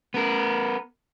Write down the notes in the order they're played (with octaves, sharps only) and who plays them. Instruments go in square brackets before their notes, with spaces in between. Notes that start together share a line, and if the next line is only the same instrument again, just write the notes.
[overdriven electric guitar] B3 A#4